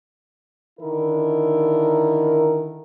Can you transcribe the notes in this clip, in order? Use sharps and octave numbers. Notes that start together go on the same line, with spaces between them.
D3 D#3 E4 A#4